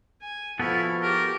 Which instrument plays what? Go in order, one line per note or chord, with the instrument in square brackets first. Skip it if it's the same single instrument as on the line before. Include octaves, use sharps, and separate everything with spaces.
[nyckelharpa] G#5
[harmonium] F3 F#4 [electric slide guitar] B3 A4 F#5 [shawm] E4 [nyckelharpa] F5
[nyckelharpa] G4 [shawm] A#4